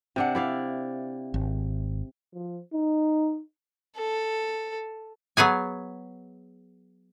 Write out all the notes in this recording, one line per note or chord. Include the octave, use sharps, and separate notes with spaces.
C3 D4 F#5
E4 D5 F5
G#1
F3
D#4
A4
F#3 B3 G#4 G#5